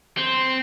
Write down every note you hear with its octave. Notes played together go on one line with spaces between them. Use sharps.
C4